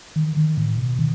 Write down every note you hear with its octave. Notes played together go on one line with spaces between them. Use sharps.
D#3
D#3
A2
B2
D#3